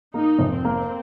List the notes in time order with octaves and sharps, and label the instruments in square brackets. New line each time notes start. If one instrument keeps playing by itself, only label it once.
[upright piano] A#3 [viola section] D#4
[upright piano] F1
[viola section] C4
[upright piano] A#3